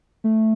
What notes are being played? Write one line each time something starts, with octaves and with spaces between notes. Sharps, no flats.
A3